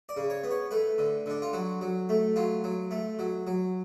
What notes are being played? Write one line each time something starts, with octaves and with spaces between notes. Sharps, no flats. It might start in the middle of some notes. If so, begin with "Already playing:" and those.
D5
C#3
C#5
B3
C#5
A3 B4
D3
D3 D4
F4
F#3 F#4
F#3
A3
F#3 F4
F#3
A3
F#3
F#3